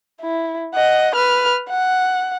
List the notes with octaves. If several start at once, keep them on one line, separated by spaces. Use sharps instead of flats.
E4
D#5 F#5
B4 F6
F#5